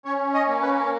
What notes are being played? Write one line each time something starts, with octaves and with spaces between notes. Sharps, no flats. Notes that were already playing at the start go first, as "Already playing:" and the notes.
C#4 C#5
D#5
A#3
B4